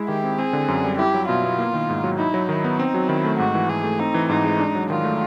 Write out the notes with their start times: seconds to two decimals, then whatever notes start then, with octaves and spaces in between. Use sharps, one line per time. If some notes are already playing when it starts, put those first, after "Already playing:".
Already playing: G#3 E4
0.09 D#3 G4
0.24 C4
0.38 C4 G#4
0.53 D3
0.68 F#2
0.84 G3
0.99 E4 G4
1.14 F#3
1.28 B2 F4
1.44 B3
1.58 A#3
1.74 D#3
1.90 G#2
2.04 F#3
2.19 D#4 E4
2.34 F#3
2.49 D#3 E4
2.64 B3
2.79 C4 D#4
2.94 F#3
3.09 D#3 E4
3.25 A3
3.39 G#2 F#4
3.54 E3
3.69 G#2 G#4
3.84 A3
3.99 C4 D#4
4.14 E3
4.29 G#2 D#4
4.45 G#3
4.60 D4
4.75 F#3
4.90 D#3 F4
5.05 A3